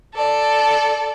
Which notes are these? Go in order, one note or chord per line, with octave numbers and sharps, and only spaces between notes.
A4 D5